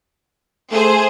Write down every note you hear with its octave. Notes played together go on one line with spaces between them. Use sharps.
A3 G#4 C5